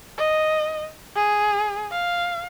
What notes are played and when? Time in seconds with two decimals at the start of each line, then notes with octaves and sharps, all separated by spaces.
0.18 D#5
1.16 G#4
1.92 F5